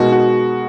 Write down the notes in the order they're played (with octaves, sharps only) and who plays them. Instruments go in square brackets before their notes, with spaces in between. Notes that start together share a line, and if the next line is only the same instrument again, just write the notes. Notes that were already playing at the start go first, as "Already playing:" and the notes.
Already playing: [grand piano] B2 G#3 D#4 A#4 [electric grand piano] F#4
[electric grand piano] F#4